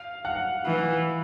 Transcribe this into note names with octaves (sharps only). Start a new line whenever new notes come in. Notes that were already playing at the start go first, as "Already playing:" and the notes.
Already playing: F5
F#5
E3